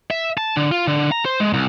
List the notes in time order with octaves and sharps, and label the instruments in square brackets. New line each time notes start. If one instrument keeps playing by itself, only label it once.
[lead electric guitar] E5
A5
D3
F4
D3
A#5
C5
G#3
C2